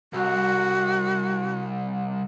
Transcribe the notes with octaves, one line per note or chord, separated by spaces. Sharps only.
C2 F#4